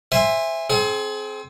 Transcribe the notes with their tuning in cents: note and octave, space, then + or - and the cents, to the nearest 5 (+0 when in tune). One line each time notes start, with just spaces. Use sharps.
C5 +0 E5 +5 G#5 -25
C4 +0 G#4 +35